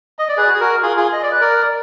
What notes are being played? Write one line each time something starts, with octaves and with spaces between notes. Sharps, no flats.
D#5
D5
G#4 B4
F#4
G#4
F#4 A#4
F4 G#4
F4 G#4
D#5
D5
B4
A#4 D5